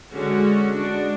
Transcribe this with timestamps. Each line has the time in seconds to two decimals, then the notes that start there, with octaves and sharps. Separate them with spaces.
0.12 D3 G#3 C#4 F#4
0.72 G#3 D4